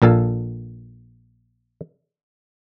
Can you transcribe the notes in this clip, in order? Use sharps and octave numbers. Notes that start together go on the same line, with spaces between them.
A#1 A#2 A4 F5 A5